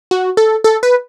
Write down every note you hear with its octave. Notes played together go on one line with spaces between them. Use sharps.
F#4
A4
A4
B4